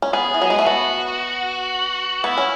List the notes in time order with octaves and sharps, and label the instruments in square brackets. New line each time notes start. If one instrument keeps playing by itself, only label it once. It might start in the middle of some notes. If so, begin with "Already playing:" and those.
[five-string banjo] C#4
[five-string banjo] B3 [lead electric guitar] G#4
[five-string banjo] E3
F#3
G#3
A3
[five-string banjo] B3 [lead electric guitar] F#4
[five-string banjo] B3 [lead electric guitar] E4
[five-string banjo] C#4